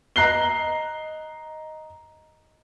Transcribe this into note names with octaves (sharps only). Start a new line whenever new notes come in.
D#5 A#5 F#6 C7 G7